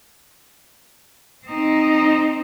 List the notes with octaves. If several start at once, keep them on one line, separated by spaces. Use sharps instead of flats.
C4 D#4